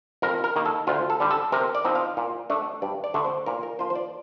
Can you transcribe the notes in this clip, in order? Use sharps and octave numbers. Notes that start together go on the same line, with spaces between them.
F2 A#4
A#4
D#3 A#3
A4
D2 F4
A4
D3 G3
A4
C3 A#4
D5
F3 C4 D#4
F5
A#2
A3 D4
G2 D5
D5
D3 A3 D4
C5
A#2 A#4
A#4
F3 A#3 F4 C5
C5
D5